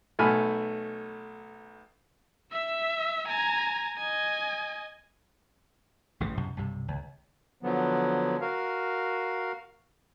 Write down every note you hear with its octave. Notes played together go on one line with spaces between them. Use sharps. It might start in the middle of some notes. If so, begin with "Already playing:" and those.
B1 A3 G#5 B5 F6
E5 E6
G#5 A#5
D#5 G#5
A1 G2 C#3 E3
B1 F#2 C3
B1 G2 C3
C#2
D3 F3 F#3 B3
F#4 A#4 F5